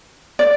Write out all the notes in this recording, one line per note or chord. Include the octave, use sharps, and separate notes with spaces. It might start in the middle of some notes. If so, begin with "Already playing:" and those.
D5